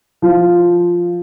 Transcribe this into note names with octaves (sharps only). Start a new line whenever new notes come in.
F3